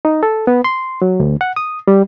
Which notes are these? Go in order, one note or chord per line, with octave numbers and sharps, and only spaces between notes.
D#4
A4
B3
C6
F#3
D2
F#5
D#6
G3